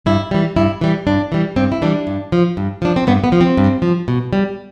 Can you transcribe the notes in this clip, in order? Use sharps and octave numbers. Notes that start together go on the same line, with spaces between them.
G2 E4
E3 G3
G2 E4
E3 G3
G2 D4
E3 G3
G2 C4
E4
E3 G3 D4
G2
F3
G2
F3 D4
C4
G2 B3
B3
F3
C4
G2
F3
B2
G3